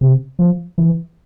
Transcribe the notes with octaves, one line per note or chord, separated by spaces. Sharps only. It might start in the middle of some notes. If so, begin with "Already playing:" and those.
C3
F3
E3